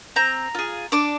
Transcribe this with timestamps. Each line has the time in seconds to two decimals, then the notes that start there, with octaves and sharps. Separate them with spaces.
0.16 C4 A#5
0.55 F4 G#4
0.92 D4 D6